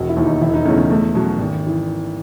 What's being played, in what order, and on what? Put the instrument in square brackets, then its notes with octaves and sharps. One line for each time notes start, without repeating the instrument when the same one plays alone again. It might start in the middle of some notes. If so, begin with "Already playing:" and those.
Already playing: [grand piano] E1 [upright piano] F#4
[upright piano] E4
[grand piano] D#2 D#3
[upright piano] D#4
[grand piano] E1 [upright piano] E4
[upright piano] D#4
[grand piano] E2 C#3 E3 A3 [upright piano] C#4
[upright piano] C#4
[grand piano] E2 [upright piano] A3
[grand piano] B2 F#3 C#4
G#1
E3